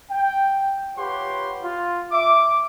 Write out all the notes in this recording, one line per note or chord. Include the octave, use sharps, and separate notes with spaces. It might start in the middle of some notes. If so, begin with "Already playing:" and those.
G5
F4 G4 B4 C#5 F#5 C6
F4
E5 D6